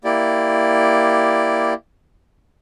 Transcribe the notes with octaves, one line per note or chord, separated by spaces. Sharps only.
A#3 E4 G4 D5